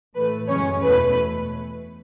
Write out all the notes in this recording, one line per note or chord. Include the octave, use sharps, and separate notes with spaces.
A2 E3 A3 B4
F#2 C#3 E3 G#3 C#4 C#5
E2 B2 A3 B4